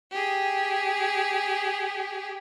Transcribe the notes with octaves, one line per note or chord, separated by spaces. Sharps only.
G4 G#4